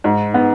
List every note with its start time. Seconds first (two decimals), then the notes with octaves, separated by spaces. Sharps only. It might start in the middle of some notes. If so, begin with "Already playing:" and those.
0.04 G#2
0.34 B3